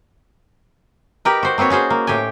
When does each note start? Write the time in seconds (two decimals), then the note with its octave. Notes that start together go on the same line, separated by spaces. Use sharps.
1.25 D#4 G4 A#4 B4
1.43 F#4 C5
1.58 A#3 C4 F#4 B4 C#5
1.70 C#4 F#4 G#4 C5
1.90 A#3
2.07 A2 G4 G5 G#5